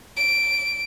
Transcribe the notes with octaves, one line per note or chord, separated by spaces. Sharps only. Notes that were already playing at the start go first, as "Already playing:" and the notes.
D7